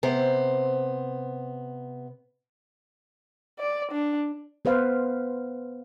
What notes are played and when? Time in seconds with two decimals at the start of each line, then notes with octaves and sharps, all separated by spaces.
0.03 C3 B3 C5
3.60 D5
3.92 D4
4.65 B3 B4 C5 F5